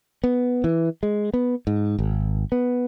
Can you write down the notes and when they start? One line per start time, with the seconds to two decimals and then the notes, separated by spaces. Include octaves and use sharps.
0.24 B3
0.64 E3
1.03 G#3
1.34 B3
1.67 G#2
1.99 G#1
2.52 B3